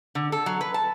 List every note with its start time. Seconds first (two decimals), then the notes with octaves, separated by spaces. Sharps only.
0.15 D3
0.32 A4
0.46 F#3
0.61 B4
0.74 A5